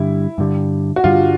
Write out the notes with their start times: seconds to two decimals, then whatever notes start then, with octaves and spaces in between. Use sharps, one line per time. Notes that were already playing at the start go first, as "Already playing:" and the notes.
Already playing: G2 D3 G3 E4
0.38 G2 D3 G3
0.96 F#4
1.04 G2 D3 G3 F4